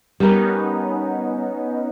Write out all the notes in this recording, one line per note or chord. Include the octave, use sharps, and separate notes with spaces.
G3 B3 C#4 D#4 A#4